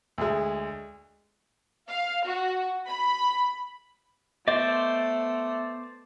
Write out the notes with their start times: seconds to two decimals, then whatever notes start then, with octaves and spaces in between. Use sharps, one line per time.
0.18 D2 G#3
1.88 F5
2.25 F#4
2.88 B5
4.48 A3 B3 C5 D5 D#5